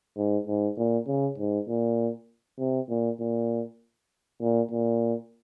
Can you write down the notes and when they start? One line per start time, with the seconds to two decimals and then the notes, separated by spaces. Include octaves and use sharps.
0.16 G#2
0.47 G#2
0.77 A#2
1.07 C#3
1.38 G#2
1.68 A#2
2.59 C3
2.89 A#2
3.20 A#2
4.41 A#2
4.71 A#2